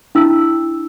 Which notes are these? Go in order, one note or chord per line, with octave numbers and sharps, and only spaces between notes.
D4 E4 E6